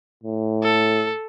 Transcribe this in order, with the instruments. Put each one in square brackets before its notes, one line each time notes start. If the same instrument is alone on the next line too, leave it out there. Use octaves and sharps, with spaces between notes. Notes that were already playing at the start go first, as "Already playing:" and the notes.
[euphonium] A2
[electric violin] A4